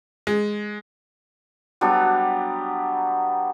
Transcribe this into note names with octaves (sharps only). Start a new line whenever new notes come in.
G#3
F#3 G3 B3 D4